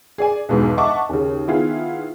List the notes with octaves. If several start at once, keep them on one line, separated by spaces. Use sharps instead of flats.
G#4 D5 G#5
B1 E2 G#2 B2
D#5 E5 F#5 A5 C#6 D6
D#2 C#3
D#3 B3 E4 F4 G#4